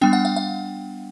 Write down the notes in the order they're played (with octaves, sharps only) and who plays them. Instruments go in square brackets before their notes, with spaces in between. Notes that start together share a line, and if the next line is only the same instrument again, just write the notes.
[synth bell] G3 B3 D4 G5
F#5
F5
F5